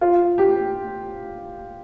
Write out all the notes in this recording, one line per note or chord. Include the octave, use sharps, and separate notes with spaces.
F4
G4